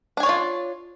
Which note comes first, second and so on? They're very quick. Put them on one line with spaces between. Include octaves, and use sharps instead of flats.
D4 G#5 C#5 D5 F4